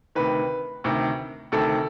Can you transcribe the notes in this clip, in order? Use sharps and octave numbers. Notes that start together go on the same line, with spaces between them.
D2 C3 D#3 B4
D2 C3 D#3
D2 C3 D#3 A4